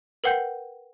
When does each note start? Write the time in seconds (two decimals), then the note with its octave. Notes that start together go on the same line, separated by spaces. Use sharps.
0.24 A#4 B4 F#5 G5 G6